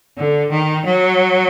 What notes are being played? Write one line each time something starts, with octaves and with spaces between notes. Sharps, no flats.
D3
D#3
F#3